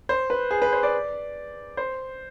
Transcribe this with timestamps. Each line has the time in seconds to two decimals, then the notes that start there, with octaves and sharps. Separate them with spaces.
0.09 C5
0.30 B4
0.51 G#4
0.62 B4
0.73 C5
0.83 D5
1.77 C5